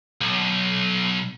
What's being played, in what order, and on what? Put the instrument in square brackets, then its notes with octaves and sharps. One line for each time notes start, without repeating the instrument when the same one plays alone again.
[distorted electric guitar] B1